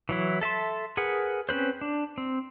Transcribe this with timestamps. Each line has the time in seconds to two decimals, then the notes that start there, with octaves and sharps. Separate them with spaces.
0.09 E3 F#3 E4
0.41 A4 E5 A5 C6
0.97 G#4 A#4 B4 F#5
1.49 C4 C#4 B4 C5
1.81 D4
2.18 C4